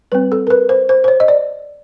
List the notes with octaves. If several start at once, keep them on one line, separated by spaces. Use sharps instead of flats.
G3 C4 B4
A4
A#4
B4
C5
C5
C5
C#5
D#5
D5